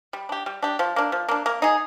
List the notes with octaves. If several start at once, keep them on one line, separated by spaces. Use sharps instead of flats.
G3
D4 G4
G3
D4 G4
F3
A#3 D4
F3
A#3 D4
A#3
D#4 G#4